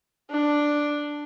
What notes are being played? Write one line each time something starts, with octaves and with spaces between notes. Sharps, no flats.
D4